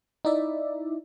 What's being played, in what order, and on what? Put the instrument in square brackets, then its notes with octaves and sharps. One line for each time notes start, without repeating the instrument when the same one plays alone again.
[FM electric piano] D#4 E4 D5 E5